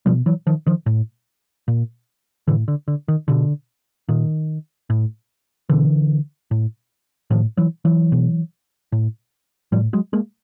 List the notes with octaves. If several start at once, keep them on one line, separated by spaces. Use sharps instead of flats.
B2 F3 G3
E3 F#3
D#3 F3
D#3 F3
A2
A#2
A2 D3 E3
D3
D3
D#3
B2 D3
A#2 D#3
A2
B2 D3 E3
A2
A2 D#3 F3
E3 F#3
E3 F#3
B2
A2
A2 F3 G3
F#3 G#3
G#3 A#3